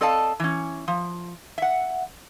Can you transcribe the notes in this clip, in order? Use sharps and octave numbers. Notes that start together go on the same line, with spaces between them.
C4 A4 D5 D#5 F5 A5
E3 C#4
F3
E5 F#5